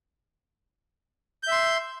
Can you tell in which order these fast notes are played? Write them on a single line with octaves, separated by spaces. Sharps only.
G6 E5 C6